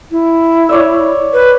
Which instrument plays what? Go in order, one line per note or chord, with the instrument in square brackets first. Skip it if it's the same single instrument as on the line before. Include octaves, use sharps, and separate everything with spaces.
[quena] E4
[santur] C#5 D5 E5
[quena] B4